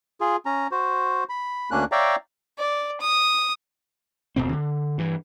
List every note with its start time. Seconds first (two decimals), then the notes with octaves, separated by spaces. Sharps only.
0.21 F4 G#4
0.46 C#4 A#5
0.71 F#4 C5
1.29 B5
1.71 D2 A#3 C#4 D4 F#6
1.92 C#5 D5 E5 F5 G5 A#5
2.59 D5
3.01 D#6
4.36 D1 C2 B2 C4
4.52 D3
4.98 G2 E3